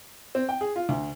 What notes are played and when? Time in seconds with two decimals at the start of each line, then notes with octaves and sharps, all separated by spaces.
0.35 C4
0.49 G5
0.61 G#4
0.76 F4
0.89 D2